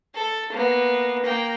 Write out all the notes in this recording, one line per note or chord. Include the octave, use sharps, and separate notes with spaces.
A4
A#3 B3
A#3 G5